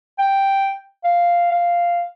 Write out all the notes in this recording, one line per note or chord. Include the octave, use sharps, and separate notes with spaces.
G5
F5
F5